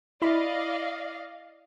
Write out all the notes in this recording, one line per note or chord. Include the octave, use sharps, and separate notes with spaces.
E4 D5 D#5 F5 B5